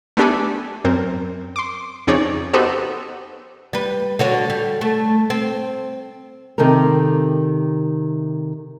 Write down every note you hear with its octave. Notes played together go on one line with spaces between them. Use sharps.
A3 B3 D4 G4 A4 G#5
F#2 C4 A#4
C6 D6
F2 C#3 D#4 G#4 C#5 D5
B3 D#4 F#4 G4 A4 C5
G3 B4
D3 F#4 C#5
G3
A3
C4
C3 D#3 G4 A4 A#4